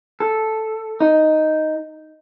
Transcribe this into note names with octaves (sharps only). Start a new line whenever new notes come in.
A4
D#4